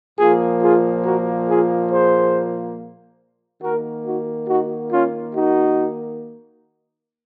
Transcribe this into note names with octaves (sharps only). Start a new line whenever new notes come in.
A#2 F3 A#3 F4 G#4
F4 G#4
F#4 A#4
F4 G#4
G#4 C5
D#3 A#3 F#4 A#4
D#4 F#4
D#4 F#4
C#4 F4
D#4 F#4